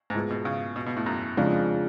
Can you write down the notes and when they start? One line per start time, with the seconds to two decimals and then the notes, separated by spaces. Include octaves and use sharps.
0.10 G#2
0.14 A2 G#3 B3 F4 G#4
0.30 B2
0.45 C#3
0.76 B2
0.86 B2
0.97 A2
1.06 F#2
1.37 F2 C#3 F3 G#3 D4 F4